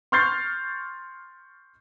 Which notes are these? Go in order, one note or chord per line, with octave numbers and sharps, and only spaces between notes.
C6 C#6 F6 G6 A6 C7